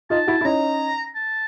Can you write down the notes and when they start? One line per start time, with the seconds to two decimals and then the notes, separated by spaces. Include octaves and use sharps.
0.10 D#4 F4 A5
0.27 E4 F#4
0.41 E4
0.45 C#4 D#4 A#5
1.16 A5